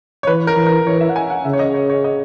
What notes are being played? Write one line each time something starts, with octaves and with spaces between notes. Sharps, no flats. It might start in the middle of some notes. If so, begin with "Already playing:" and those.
C#5
E3 B4
A#4
E3
A#4
E3 C#5
E5
F#5
G#5
F#5
C#3 E5
C#5
D#5
C#5
C#5
D#5